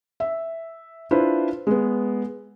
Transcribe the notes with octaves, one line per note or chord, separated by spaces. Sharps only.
E5
D4 E4 F4 B4 C5
G#3 B3